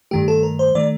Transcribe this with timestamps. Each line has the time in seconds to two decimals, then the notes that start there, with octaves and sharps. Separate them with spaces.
0.11 G2 D#3 A3 G4
0.28 A4
0.43 A#4
0.59 C5
0.75 D#3 A3 D5